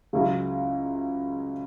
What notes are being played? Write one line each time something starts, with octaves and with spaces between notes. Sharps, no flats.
C#2 C#3 F#3 C#4 E4